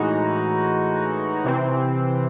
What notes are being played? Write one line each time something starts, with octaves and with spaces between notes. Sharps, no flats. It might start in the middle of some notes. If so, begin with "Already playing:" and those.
Already playing: A2 E3 G#3 D#4 F#4
C3 E3 C4